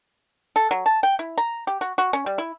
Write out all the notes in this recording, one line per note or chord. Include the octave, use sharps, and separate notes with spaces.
A4
F#3
A5
G5
E4
A#5
G4
F#4
F#4
C#4
G3
E4